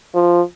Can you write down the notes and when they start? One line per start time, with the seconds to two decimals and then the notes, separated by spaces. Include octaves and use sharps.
0.15 F3